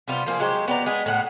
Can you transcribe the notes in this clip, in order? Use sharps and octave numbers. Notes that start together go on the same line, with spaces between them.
C3 G3 B3 F4
F3 A#3 F4 G#4
F#3 G#3 G4 C5
B3 G4 D5 A#5
G#3 B3 G#4
A2 F#5